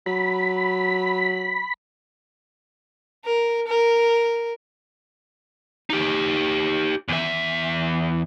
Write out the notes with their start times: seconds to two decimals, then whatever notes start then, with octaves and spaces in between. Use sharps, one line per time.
0.06 F#3 B5
3.25 A#4
3.68 A#4
5.90 D#4 G4
7.08 E2 E5